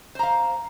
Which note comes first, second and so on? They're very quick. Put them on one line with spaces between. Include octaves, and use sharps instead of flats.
C5 A#5 F5